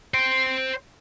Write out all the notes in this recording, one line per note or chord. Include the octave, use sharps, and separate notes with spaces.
C5 G5